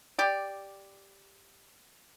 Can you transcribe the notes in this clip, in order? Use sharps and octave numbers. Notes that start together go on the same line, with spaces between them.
G4 D5